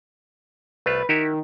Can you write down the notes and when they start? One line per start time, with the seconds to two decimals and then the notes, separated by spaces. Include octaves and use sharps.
0.86 C2 A3 F4 B4
1.09 D#3 E4 F#4 G4